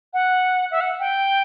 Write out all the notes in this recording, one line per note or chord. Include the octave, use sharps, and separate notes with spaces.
F#5
E5
F#5
G5